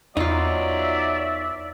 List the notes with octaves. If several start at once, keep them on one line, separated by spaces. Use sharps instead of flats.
E2 F#3 D#4 F4 D5 E5